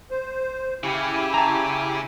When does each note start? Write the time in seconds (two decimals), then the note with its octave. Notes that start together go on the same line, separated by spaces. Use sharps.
0.11 C5
0.83 C#3 E4 G4 G#5
1.34 A5 A#5